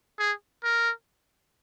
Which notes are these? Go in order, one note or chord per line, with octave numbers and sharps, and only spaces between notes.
G#4
A#4